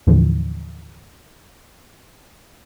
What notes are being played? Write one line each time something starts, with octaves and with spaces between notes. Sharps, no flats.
D#2 A2 D3 E3 F3